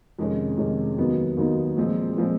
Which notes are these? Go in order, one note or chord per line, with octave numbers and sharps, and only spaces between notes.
F2 C3 D#3 G#3 C#4
F2 C3 D#3 G#3 C#4
D#2 D#3 F#3 B3 D#4
D#2 D#3 F#3 B3 D#4
A#2 F3 G#3 C4
A#2 F3 G#3 C4